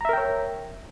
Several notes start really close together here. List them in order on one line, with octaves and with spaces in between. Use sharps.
A#5 E5 A#4 G5 C#5